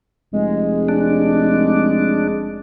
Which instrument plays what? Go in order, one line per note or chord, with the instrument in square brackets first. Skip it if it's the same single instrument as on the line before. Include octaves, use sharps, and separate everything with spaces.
[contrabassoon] F1 [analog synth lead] G#3
[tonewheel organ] D4